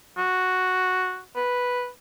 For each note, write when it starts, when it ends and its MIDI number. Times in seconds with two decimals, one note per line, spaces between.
0.18 1.20 66
1.36 1.88 71